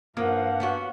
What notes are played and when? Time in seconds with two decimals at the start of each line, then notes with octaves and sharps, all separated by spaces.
0.17 G2 F3 A#3 F5 F#5
0.60 B3 C#4 F#4